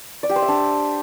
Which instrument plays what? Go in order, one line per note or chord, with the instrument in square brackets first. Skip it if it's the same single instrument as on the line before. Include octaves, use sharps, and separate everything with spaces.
[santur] D5
G4
C5
E5
D4